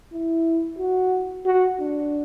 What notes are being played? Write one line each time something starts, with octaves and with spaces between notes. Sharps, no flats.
E4
F#4
F#4
D4